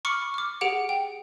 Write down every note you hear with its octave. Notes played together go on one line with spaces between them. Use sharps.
B5 C#6 D6 F6 C#7
D6 F6
G4 G#4 F#5 D7
G5